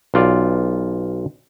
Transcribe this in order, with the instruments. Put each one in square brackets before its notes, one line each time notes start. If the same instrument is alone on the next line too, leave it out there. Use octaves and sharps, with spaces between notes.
[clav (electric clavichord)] B1 F4 D5